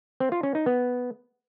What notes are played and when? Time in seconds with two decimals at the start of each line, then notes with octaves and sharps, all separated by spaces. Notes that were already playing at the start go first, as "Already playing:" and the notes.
0.20 C4
0.32 F4
0.43 C#4
0.55 D#4
0.66 B3